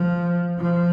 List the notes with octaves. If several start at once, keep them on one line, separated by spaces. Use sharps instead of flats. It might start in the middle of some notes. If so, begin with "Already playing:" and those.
Already playing: F3
F3